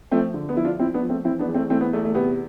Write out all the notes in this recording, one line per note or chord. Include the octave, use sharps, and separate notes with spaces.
F3 A3 C4
D3
B3
F3 E4
D4 F4
F3 C4 E4
B3 D4
F3
A3 C4
E3 C4 E4
B3 D4
E2
A3 C4
E3 A3 C4
B3
E2 A3
A3
C3 B3